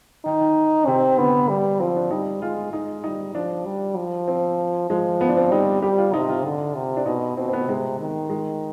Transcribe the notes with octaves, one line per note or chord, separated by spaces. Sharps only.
D#3 D#4
D#3
C3 C4
D3 B3
G3
F3 C4
D4
G3 D#4
G#3 F4
G#3 D#4
G3 D#4
F3 D4
G3
F3
C4
F3 G#3
B3
D4
C4
G3 D#4
G3 G4
F4
C3 D#4
F4
D3
C3
D4
B2 D#4
B2 C4
C4
B3
C3 G#3
D#3
G#3